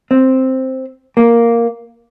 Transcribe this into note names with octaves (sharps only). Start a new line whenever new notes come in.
C4
A#3